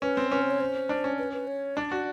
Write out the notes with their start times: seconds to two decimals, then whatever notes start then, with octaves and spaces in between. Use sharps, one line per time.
0.02 C#4 B4
0.17 C4
0.31 C#4 B4
0.42 C5
0.51 C#5
0.60 C5
0.89 D4
1.04 C#4
1.18 B4
1.33 B4
1.47 C#5
1.76 D4 D5
1.92 F#4